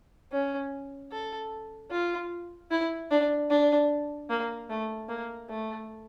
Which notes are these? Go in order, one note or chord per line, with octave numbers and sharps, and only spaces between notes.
C#4
A4
F4
E4
D4
D4
A#3
A3
A#3
A3